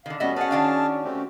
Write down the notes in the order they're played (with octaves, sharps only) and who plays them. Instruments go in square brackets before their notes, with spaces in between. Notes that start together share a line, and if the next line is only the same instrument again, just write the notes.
[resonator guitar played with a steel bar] D3 D#3 [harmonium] F5
[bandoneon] A2 G3 [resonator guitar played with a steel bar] B3 D#5 E5 [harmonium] C#4 F#4
[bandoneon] G#4 A5 F6 [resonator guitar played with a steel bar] B4 F#5
[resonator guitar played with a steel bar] D#3 D4 F5
[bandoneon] A3 C4 G4